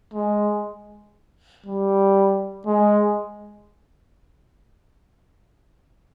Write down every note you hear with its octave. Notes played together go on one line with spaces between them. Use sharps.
G#3
G3
G#3